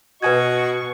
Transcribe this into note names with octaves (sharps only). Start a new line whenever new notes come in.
B2 F#4 B4 D#5 G#5 C#6 G#6